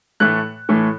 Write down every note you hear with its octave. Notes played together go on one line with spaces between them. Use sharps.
A2 E3 A3 F#6
A2 E3 A3